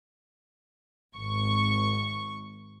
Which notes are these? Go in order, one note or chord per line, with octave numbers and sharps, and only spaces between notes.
G#1 C#6